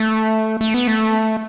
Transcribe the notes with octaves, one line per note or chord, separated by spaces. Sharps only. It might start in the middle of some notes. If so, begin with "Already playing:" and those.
Already playing: A3
A3
B3
A3